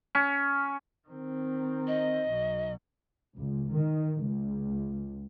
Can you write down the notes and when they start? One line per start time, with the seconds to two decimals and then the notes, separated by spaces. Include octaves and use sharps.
0.15 C#4
1.08 D#3 C4
1.88 D#5
2.26 B1 B2
3.37 C#2
3.72 D#3
4.24 C#2